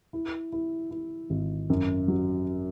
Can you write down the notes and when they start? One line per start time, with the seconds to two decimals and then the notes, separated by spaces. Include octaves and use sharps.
0.13 E4
0.52 E4
0.91 E4
1.30 G#1
1.70 F#2
2.08 F#3